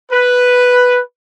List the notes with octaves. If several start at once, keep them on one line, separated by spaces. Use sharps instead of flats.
B4